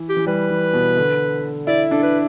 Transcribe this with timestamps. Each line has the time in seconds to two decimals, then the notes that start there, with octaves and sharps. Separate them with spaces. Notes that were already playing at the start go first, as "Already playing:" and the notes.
Already playing: E3
0.09 G4
0.16 E3
0.27 G3 B4
0.50 E3
0.73 B2
0.97 D3
1.67 E4 D5
1.91 D4 A4
2.03 B4